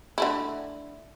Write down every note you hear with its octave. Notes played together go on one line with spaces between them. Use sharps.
D3 A3 E4